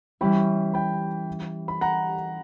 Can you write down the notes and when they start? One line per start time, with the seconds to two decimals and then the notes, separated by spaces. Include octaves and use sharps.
0.21 E3 G3 C#4 E4 G5 B5
0.73 G5 B5
1.68 B5
1.81 F#5 A#5